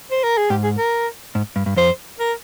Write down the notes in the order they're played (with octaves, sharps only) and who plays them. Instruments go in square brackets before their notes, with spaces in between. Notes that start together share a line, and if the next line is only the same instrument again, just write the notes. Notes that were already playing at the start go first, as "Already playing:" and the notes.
[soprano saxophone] C5
A#4
G#4
[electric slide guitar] G#2 [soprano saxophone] G4
[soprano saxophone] G#4
A#4
[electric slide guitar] G#2
G2
G2
[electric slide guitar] F2 [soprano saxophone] C5
[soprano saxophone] A#4